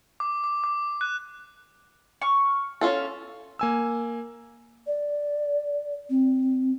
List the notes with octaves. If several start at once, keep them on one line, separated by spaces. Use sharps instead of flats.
D6
D6
D6
F#6
C#6 F6
C#4 F4 A4
A#3 G#5 E6
D5
C4